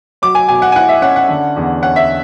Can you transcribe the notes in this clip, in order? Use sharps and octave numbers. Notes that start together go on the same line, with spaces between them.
F#3 D6
G#5
B2 G#5
F#5
G#5
E4 F#5
E5
C#4 F#5
F#5
D3
E2
C#4 F#5
E5